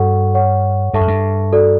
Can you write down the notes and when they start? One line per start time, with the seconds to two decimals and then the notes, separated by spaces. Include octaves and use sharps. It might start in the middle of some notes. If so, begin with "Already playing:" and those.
Already playing: G2 F#4 A4 C#5 F#5 C#6
0.34 C#5 F#5 C#6
0.94 G2 A4 E5 A5 C#6
1.01 F#2
1.08 G2
1.53 F#4 A4 D5